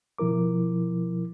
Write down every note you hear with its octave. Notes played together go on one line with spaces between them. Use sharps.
B2 F3 E4 A#4 D6